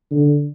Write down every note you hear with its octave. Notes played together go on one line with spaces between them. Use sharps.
D3